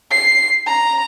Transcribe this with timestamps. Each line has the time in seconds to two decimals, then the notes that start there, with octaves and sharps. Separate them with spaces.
0.11 C7
0.67 A#5